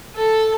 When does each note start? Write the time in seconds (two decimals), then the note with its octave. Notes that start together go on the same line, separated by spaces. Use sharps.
0.15 A4